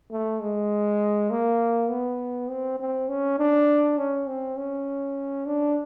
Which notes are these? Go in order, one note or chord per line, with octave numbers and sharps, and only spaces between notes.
A3
G#3
A#3
B3
C4
C4
C#4
D4
C#4
C4
C#4
D4